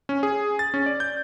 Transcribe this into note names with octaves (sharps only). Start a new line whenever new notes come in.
C#4
G#4
A6
C#4
D5
G6